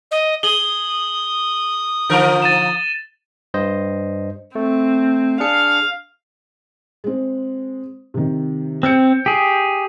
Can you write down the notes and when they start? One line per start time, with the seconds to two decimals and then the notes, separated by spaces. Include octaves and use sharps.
0.11 D#5
0.43 G#4 D#6 F#7 G7
2.09 D3 F3 A#4
2.42 A6 D#7 E7
3.54 G2 C5 D#5
4.55 A3 C4
5.40 D4 G#4 F5 C#7
7.04 G#3 C4
8.14 C3 D#3
8.83 C4 E6 G6 C#7
9.26 G4 G#4